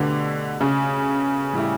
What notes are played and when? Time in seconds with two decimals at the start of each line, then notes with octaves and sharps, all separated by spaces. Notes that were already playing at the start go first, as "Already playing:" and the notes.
Already playing: B2 D3 A3 D4 G4 B4
0.61 C#3
1.53 A2 G3 C#4 E4 G4